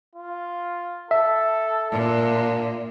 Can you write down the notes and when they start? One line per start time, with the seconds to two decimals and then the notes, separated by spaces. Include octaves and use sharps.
0.15 F4
1.11 A4 E5
1.92 A#2 D4